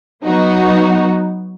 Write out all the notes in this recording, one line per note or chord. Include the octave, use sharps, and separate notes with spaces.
F#3 B3 D#4 F#4